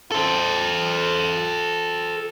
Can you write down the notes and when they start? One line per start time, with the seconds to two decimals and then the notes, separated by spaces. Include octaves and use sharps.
0.12 A4 C5